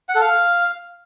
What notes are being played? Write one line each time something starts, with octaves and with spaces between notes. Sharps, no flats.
F#5
A4
F5